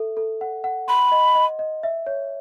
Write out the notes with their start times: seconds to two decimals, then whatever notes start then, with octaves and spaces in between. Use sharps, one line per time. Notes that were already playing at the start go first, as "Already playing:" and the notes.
Already playing: A4 E5
0.17 A4
0.41 F#5
0.64 F#5
0.88 B5 C6
1.12 D#5
1.35 D#5
1.59 D#5
1.83 E5
2.07 C#5